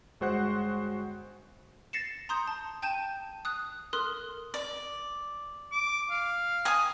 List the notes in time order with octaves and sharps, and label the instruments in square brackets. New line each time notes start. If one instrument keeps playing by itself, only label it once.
[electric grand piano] G1 G#3 F#4 C5 F#5 F#6
[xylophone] A6 A#6 C7 C#7 E7
A#5 C6 D#6 G6
A5
G5 A5 G6 D#7 E7
D#6 F#6
A4 A#4 C6 D#6 F6 F#6
[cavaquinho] D5
[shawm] D6
F5
[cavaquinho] G#5 D#6